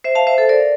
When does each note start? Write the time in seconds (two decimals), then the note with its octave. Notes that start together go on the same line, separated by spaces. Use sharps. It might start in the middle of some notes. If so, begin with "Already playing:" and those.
0.04 C5 E5
0.15 F5 A5
0.27 C5 E5
0.38 A4 C5
0.49 A#4 D5